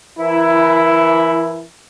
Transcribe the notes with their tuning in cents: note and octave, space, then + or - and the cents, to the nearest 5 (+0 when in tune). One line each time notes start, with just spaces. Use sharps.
E3 +30 E4 +5 A#4 +35